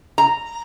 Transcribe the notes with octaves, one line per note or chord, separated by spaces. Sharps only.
A#5